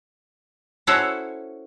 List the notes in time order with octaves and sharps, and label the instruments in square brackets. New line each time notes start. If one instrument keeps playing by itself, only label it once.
[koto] C#4 E4 F#4 A4 C5 C#5